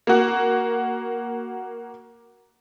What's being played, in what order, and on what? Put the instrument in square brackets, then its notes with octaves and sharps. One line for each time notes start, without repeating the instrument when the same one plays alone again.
[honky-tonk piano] A#3 F#4